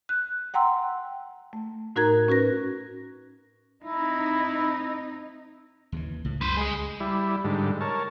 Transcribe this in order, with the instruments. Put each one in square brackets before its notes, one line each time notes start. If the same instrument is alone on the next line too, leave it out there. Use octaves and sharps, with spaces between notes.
[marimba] F#6
F#5 G5 A#5 C6 E6
A3
A2 D#4 F#4 A#4 A#5 G#6
C#4 F#4 B4 A#6
[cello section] C4 D#4 [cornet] E4
[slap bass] D#2 C#3 E3
[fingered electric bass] C#2 [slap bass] A2
[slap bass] F#2 [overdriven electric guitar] B4 C5
[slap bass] G3 [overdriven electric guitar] G#3 G#4
[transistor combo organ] G3 E4
G#2 D3 G3
A#4 C#5 A5